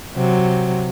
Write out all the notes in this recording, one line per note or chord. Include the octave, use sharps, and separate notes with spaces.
C3 F#3